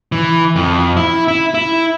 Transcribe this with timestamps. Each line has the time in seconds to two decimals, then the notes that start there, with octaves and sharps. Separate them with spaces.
0.12 E3
0.56 F2
0.97 E4
1.28 E4
1.54 E4